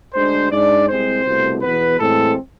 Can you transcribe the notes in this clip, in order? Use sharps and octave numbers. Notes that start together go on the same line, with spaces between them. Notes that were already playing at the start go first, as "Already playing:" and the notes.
D2 D3 G#3 D4 C5
G#2 G#3 D4 D5
C2 C3 G#3 C4 C5
C2 B2 A3
E2 B2 B3 B4
A2 E3 G#3 C4 A4